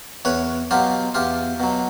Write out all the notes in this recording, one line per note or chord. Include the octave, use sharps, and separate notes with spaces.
E2 B4 C#5
B2 F#3 F4 G4
E2 F4 G4
B2 F#3